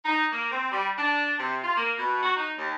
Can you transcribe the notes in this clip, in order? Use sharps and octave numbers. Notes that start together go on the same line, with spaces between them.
D#4
A#3
C4
G3
D4
C3
F4
A#3
B2
F#4
D#4
D#2